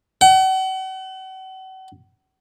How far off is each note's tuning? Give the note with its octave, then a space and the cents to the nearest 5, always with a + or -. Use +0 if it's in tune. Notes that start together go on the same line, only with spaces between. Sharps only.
F#5 +40